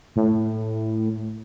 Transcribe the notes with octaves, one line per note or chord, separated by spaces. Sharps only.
A2